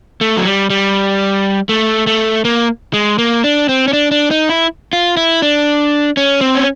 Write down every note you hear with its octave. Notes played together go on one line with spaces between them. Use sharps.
A3
F#3
G3
G3
A3
A3
A#3
G#3
A#3
D4
C4
C#4
D4
D4
D#4
E4
F4
E4
D4
C#4
C4
C#4